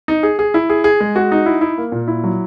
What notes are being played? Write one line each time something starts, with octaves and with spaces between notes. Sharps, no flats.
D#4
G#4
G#4
E4
G#4
G#4
G#3
F#4
D#4
E4
E4
A#3
A#2
E4
F#3